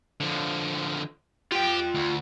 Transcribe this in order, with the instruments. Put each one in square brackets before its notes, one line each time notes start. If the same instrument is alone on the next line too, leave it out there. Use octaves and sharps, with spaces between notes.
[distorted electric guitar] D3 F3
[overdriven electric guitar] F4 G5 [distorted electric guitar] G4
[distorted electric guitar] D2